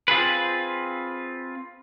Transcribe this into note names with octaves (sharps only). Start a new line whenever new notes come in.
C4 F4 G#4 B4